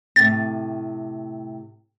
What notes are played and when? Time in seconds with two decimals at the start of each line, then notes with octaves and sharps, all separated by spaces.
0.16 A2 C3 A6